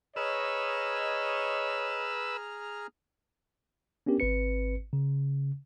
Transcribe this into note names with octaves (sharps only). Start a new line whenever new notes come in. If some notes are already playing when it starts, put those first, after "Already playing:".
G#4 B4 C#5 D#5 A#5 E6 F6
B3 C#4 D4 G4 A#4
G#1 C4 B4 C#7
C#3